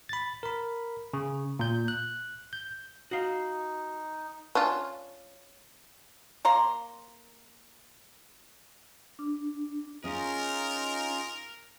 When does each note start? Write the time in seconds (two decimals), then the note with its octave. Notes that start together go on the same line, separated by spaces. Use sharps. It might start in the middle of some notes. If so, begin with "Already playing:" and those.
0.09 B5 A6
0.43 A#4 B5
1.13 C#3
1.59 A#2 G6
1.88 F#6
2.53 G6
3.11 D#4 F#4 F5
4.55 C#4 D4 F4
6.45 A#3 A#5 C6
9.19 D4
10.04 C#4 D#4 F4 G#4 A#4 D#5